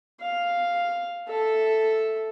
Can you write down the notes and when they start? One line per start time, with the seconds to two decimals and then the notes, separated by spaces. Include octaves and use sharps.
0.21 F5
1.28 A4 E5